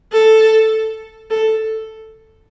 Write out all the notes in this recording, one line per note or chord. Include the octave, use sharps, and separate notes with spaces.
A4
A4